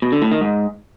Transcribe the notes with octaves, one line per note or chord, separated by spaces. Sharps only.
B2
D3
A2
D#3
G#2